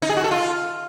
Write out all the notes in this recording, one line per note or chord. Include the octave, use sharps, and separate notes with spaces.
D#4
G#4
F#4
A4
F4